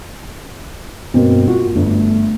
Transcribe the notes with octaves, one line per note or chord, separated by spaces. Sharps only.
G2 B2 A#3 C4
A#3 F4 F#4
G1 A3